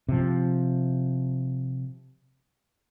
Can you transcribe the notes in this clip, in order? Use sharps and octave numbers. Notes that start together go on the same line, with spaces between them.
C3 F3